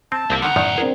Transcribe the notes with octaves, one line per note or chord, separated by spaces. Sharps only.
C4 A5
C2 A#3 C4 E4
D2 D3 D#3 F#5 A#5
F#2 A2 D#3 D5
C4 D4 G#4 A#4